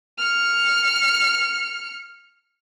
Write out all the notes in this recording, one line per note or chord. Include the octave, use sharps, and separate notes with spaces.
F6 C#7